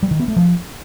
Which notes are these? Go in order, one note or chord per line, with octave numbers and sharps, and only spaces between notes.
G3
D#3
B3
A3
F3